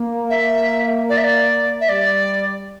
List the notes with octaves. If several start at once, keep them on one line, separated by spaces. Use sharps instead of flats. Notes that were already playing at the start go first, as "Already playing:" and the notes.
Already playing: A#3
E5
D5
E5
D5
E5
G3 D5